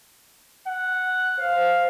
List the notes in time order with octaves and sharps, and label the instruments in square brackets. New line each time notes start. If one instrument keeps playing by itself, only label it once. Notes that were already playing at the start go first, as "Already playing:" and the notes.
[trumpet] F#5
[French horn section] C5 [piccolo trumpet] F5